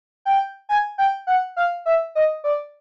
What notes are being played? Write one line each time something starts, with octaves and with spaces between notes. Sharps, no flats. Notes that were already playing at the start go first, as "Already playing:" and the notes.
G5
G#5
G5
F#5
F5
E5
D#5
D5